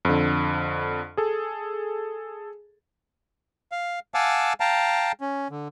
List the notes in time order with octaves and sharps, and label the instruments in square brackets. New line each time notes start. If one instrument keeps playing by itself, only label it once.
[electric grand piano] F2 D3
G#4 A4
[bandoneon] F5
F5 F#5 G#5 A5 D6 E6
F5 G5 A5 A#5
C#4
D3